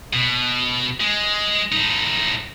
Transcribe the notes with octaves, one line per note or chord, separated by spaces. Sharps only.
B2
G#3
A2 D#4